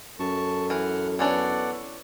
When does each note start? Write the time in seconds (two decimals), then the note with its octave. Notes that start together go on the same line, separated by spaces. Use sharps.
0.20 F#2 A4 A5 C#6
0.70 E3 F#5 F6
1.19 E3 B3 C#4 D4 A4 D5 F#5